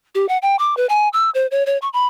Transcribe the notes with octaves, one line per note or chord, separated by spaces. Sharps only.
G4
F#5
G5
D6
B4
G#5
E6
C5
C#5
C#5
C#6
B5